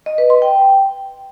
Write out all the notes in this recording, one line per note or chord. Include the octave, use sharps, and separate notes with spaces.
D#5
B4
C6
G5